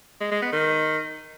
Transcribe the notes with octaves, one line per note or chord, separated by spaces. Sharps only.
G#3
G#3
B3
D#3